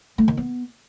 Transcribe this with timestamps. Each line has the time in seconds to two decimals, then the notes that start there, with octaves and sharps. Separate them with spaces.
0.18 A3
0.28 D#3
0.37 B3